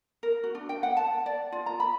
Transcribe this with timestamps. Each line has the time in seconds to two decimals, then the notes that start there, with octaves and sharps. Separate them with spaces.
0.23 A#4
0.44 F#4
0.55 D4
0.69 G5
0.83 F#5
0.97 A5
1.26 D5
1.52 F4
1.66 A#5
1.80 B5